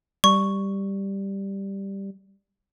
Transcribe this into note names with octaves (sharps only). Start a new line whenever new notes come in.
G3 C#6